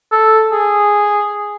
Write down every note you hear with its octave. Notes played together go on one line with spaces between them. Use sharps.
A4
G#4